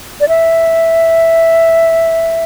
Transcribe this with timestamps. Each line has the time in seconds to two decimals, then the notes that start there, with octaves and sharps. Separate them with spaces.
0.20 D5
0.28 E5